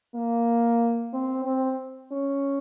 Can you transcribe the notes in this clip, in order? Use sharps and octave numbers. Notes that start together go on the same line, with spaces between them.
A#3
C4
C4
C#4